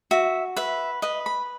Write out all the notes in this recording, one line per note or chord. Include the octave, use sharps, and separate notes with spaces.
F#4 E5
B4 E5
B4 D#5
B5